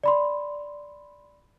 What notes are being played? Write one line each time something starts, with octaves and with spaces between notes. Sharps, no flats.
D5 B5 C6